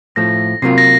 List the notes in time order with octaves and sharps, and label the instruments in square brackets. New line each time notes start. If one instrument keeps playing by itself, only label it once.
[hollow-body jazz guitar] A2 F3 A3 [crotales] A#6
[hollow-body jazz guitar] C3 F#3 A#3 F4 [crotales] C7
[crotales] A#6